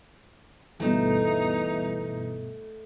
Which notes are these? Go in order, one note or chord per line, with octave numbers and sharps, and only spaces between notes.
D2 G2 B2 E3 A3 D#4